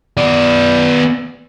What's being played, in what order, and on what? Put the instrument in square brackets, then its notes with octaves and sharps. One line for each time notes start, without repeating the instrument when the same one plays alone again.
[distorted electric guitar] B3 D5